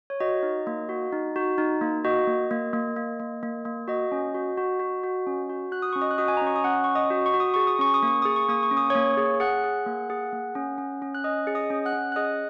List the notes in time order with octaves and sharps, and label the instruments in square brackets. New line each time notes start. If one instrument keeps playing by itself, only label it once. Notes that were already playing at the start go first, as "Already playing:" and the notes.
[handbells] C#5
F#4 D#5
D#4
A#3
F#4
D#4
F#4
D#4
A#3
F#4 D#5
A#3
A#3
A#3
A#3
A#3
A#3
A#3
F#4 D#5
C#4
F#4
F#4
F#4
F#4
C#4
F#4
F#4 F#6
D#6
C#4 C#6
D#5 D#6
F#6
F#4 D#5 D#6
G#5
A#5
C#4 C#6
D#6
C#4 F#5 F#6
C#4 C#6
D#5 D#6
F#4
C#6
F#4
D#6
G#4 C#6
D#6
C#4 C#6
D#6
A#3
C#6
G#4 D#6
C#6
A#3 D#6
C#6
C#4
D#6
A#3 C#5 C#6
G#4
G#4 F#5 F#6
G#4
A#3
G#4
A#3
C#4
C#4
C#4
F#6
C#4 D#5 D#6
G#4
D#5 D#6
C#4
F#5 F#6
C#4
F#6
G#4 D#5 D#6